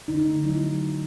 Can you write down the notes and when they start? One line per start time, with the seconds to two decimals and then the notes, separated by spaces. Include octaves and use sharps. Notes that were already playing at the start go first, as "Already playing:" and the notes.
0.08 D3 D#4
0.27 A3
0.44 F#3 E4